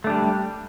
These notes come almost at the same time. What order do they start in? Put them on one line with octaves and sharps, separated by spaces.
A3 D4 G3